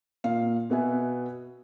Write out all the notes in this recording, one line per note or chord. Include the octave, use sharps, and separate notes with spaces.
A#2 F5
B2 B3 E5 G#5